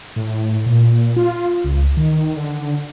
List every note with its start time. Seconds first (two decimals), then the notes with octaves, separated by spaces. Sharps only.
0.16 A2
0.66 A#2
1.17 F4
1.64 C#2
1.97 D#3
2.36 D3